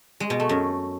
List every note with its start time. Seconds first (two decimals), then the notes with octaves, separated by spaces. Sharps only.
0.20 G#3
0.30 B2
0.40 A3
0.49 F#2